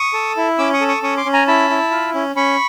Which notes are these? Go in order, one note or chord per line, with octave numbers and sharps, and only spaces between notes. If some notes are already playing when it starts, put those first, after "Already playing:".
Already playing: C#6 D#6
A4
E4
C#4 D6 E6
C#6 D#6
A4
C#6 D#6
C#4 C#6 D#6
C6 D6
C#4
G#5 A#5
E4 A5 B5
E4
F4
C#4
C#4 B5 C#6